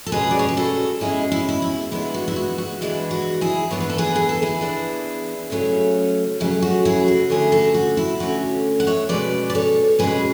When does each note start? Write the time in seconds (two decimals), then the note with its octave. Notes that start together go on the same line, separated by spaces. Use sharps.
0.06 A4
0.12 B2 G#3 C#4 G#4 B4
0.31 D5
0.39 C#5
0.49 B4
0.57 F#4 A4
1.01 B2 G#3 C#4 E4 G#4
1.32 E4
1.49 E4
1.62 E4
1.91 E3 G#3 B3 D4 E4
2.14 F#4
2.28 E4
2.36 F#4
2.58 F#4
2.81 E3 G#3 B3 D4 E4
3.11 F#4
3.41 E4 G#4
3.71 E3 B3 D4 C#5
3.80 B4
3.89 A4
3.98 G#4 B4
4.16 G#4
4.29 A4
4.42 E4 G#4
4.61 E3 B3 D4
5.50 C#3 F#3 A3 C#4
6.40 C#3 F#3 A3 C#4 E4
6.62 F#4
6.85 E4 G#4
7.08 F#4
7.30 D3 A3 C#4 E4 G#4
7.52 F#4 A4
7.75 F#4
7.97 E4
8.20 D3 A3 C#4 F#4
8.80 F#5
8.87 C#5 E5
9.09 B2 G#3 C#4 B4 D5
9.50 D5
9.55 A4 C#5
9.99 B2 G#3 C#4 G#4 B4